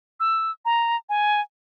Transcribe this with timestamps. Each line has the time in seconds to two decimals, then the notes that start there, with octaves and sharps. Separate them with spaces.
0.20 E6
0.65 A#5
1.09 G#5